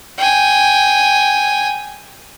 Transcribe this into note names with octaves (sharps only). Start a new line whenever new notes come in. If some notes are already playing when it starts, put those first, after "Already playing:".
G5 G#5